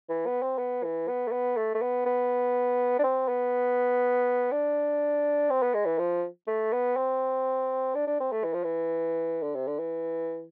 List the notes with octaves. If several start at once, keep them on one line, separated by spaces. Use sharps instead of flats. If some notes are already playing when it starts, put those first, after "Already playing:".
E3
B3
C4
B3
E3
B3
A3
B3
A3
A3
B3
B3
D4
C4
B3
D4
C4
B3
G#3
E3
F3
A3
B3
C4
D4
D4
C4
A3
E3
F3
E3
D3
C3
D3
E3